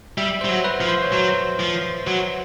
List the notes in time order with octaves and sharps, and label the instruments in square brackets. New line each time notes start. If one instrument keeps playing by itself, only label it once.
[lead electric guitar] G3 [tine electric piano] E5
[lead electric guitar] G3 [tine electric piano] C5
[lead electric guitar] F#3
[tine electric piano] B4
[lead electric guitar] F3
[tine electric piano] C5
C#5
[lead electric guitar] F#3 [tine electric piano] C5
[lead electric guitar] F3
F#3